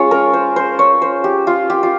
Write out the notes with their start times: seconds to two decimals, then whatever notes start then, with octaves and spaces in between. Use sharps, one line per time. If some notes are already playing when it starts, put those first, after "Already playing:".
Already playing: G#3 C#4 F4 C#5
0.11 A#4
0.33 C5
0.56 C5
0.79 C#5
1.02 C5
1.24 G4
1.47 F4
1.70 G4
1.83 F4